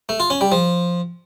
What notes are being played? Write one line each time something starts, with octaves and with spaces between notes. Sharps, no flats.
A3
F4
C#4
G3
F3